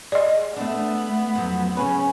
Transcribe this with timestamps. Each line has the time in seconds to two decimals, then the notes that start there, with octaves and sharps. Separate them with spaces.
0.12 G#4 D5 D#5
0.56 A3 B3 D4
1.35 F2 F#3
1.77 C#3 C#4 B4